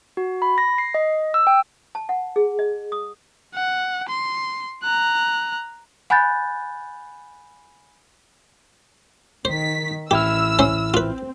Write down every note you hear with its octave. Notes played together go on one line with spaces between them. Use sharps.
F#4
B5
A#6
C7
D#5
E6
G5
A5
F#5
G#4
D#5
D#6
F#5
C6
A#5 F#6
F#5 G#5 B5 F#6 G6 A6
D#3 C5 B6
A1 E4 G4 E6 F6
C#4 C5 E5
C4 F4 B4